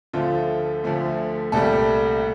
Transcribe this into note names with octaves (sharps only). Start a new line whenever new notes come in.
D2 D3 F3 A3 F4
D2 D3 F3 A3
C2 A#2 G3 A3 A4